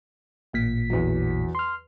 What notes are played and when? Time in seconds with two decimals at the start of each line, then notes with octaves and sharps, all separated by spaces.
0.53 A1 A#2 B6
0.90 E2 F#3
1.55 C6 F6